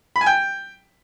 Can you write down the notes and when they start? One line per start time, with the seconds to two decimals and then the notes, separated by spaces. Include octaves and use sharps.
0.16 B5
0.21 G#5
0.26 G5